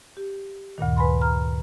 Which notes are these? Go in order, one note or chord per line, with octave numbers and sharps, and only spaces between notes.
G4
D2 G2 A#2 D#3
B4 G#5 B5 C6
A#5 F6